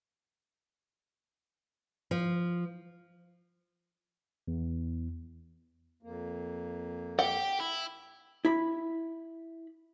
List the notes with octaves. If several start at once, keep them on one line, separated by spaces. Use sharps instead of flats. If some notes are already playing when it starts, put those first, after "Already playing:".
F3
E2
F2 A#3
G4 F#5 G5
E4
E4 B5